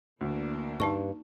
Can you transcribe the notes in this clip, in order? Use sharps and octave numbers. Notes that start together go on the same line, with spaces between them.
D2 E3 A#3 D4
G2 D#4 A5 C#6